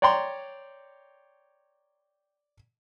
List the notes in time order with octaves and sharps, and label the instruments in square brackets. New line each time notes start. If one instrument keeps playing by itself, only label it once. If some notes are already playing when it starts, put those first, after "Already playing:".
[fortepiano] C#5 D5 G5 A#5 C6